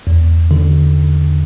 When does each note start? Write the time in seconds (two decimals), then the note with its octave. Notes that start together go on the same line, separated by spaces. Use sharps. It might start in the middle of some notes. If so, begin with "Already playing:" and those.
0.07 E2
0.51 D3